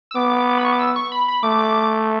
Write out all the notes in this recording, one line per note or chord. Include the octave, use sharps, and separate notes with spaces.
E6
B3 D6
B5
C#6
D6
E6
C#6
B5
B5
A3 D6